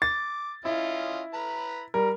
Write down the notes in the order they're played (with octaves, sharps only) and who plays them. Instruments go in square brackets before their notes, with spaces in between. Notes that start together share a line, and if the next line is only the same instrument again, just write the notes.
[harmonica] D6 [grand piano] A6
[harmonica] C#4 F4 D#5 [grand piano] E4
[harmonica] B4 A#5 B5
[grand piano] G3 A#4